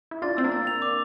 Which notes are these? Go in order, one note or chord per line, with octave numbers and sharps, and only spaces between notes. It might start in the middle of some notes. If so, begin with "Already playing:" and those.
E4
D4 F4 A6
C4 E6
A#3 D4
A6
F7
D6